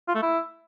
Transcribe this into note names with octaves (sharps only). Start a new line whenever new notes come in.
F4
A3
E4